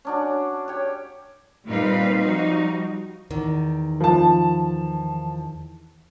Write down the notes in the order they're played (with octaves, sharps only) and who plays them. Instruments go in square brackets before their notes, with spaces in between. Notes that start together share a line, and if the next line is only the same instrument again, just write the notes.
[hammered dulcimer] C#4 D4 F#4
G4 C#5
[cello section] A#2 G3 C4 D#4 B4 F5
F3 G3 D#4 F#4
[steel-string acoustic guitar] E2 D#3
[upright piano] F3 A5